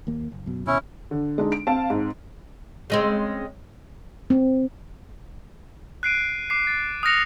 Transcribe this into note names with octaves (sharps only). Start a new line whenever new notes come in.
D#2 A#3
F#1
F#2 B2 F#3
D#2 B2 C#4 E4
D3
G#3 D4 D#4
D7
C4 F5 A5
G#2
C#3 G#3 C4
C4
F#6 C7 D7 D#7
D6 C7
A6
D#6 F6 F#6 A#6 C#7 F7